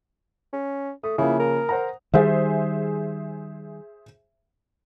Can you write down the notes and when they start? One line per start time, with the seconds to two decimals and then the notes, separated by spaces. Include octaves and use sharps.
0.53 C#4
1.04 A3 D#6
1.18 C#3 F3 A#3 E4
1.39 A#4
1.69 C5 F#5 A#5
2.14 D#3 G3 G#4 C5 E5